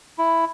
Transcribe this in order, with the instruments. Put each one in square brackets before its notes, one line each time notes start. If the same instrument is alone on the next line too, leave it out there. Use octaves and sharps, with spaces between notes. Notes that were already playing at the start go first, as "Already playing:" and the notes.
[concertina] E4